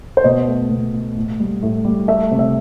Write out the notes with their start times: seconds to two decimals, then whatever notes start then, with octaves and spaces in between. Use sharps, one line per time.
0.17 C5
0.24 B2 D#5
0.48 A3
0.70 B2
0.94 A3
1.16 A2
1.40 G3
1.63 A2
1.85 G3
2.08 A3 E5
2.31 C3
2.39 E5